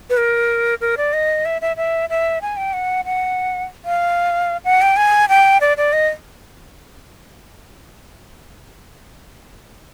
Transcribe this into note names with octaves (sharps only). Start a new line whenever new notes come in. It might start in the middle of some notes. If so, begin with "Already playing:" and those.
B4
A#4
A#4
D5
D#5
E5
E5
E5
E5
G#5
G5
F#5
F#5
F5
F#5
G5
G#5
G5
D5
D5
D#5